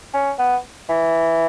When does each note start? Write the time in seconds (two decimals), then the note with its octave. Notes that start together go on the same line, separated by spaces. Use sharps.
0.14 C#4
0.39 B3
0.89 E3